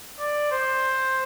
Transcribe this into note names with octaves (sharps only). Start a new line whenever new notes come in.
D5
C5